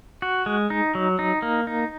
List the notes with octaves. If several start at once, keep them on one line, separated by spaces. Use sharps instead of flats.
F#4
G#3
D#4
F#3
D#4
A#3
D#4